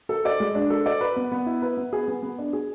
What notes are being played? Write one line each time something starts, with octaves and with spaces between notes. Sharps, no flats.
A4
D5
G#3
D4
A4
D5
B4
B3
B3
E4
B4
B3
G#4
B3
B3
D4
G#4